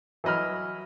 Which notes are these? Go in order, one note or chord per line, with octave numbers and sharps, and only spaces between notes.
E3 F#3 D#5 B5 F6